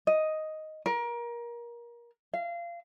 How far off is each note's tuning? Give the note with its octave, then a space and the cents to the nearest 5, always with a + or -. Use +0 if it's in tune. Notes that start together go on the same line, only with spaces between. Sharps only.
D#5 +5
A#4 +25
F5 -25